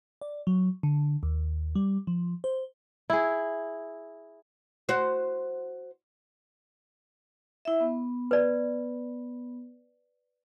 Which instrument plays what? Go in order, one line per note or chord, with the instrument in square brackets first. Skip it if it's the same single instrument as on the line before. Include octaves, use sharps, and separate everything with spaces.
[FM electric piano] D5
F#3
D3
D#2
G3
F3
C5
[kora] E4 G#4
[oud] F#4 C5
[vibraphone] E4 E5
B3
[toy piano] B4 D5